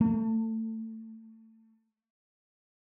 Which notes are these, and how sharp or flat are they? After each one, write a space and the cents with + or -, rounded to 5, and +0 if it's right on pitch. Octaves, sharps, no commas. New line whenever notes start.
A3 +25